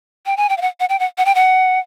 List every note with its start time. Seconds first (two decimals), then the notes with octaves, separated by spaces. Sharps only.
0.26 G5
0.37 G#5
0.49 G5
0.57 F5
0.62 F#5
0.80 F#5
0.89 G5
1.00 F#5
1.18 F#5
1.25 G5
1.35 F#5